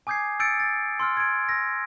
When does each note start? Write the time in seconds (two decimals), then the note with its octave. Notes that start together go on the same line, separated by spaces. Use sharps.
0.07 G#5 D6 D#6 G6 G#6 C7
0.40 E6 G6 A6 C#7 D7
0.60 A6
1.00 C6 E6 F6
1.17 G#6 D7
1.49 E6 A#6